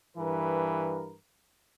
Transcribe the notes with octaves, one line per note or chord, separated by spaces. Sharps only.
G2 E3 A#4 B4